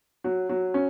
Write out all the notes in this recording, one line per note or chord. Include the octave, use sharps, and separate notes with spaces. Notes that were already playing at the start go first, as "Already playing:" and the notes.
F#3
F#3
C#4